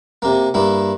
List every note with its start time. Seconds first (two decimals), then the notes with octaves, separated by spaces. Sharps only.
0.22 C3 A#3
0.54 G2 A#3 E4